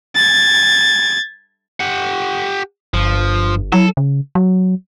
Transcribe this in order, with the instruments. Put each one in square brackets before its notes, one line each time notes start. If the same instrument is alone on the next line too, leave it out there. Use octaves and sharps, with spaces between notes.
[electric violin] G#6 A6
[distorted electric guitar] G4 F#5
[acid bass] G1 [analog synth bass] G2 [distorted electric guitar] F3
[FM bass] F#3 [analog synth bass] E4 [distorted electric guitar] A4
[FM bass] C#3
F#3